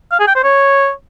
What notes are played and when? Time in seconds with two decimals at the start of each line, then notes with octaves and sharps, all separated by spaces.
0.12 F5
0.20 G#4
0.27 G5
0.35 C5
0.43 C#5